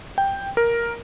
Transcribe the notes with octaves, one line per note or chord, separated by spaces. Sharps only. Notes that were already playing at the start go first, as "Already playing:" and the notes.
G5
A#4